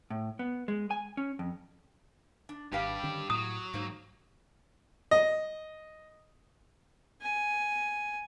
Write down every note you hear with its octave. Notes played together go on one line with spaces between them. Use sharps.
A2
B3
G#3
G#5
C#4
F2
D4
G#1 G2 G3 G4 B4 F5
D3 D#3 C#4
A2 F#3 D#6
G#2 A#3 D#4 C5
D#5
G#5